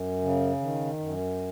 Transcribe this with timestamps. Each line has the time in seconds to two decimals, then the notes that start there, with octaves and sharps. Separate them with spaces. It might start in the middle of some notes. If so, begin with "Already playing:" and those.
Already playing: F#2
0.21 C#3
0.60 D#3
0.99 F#2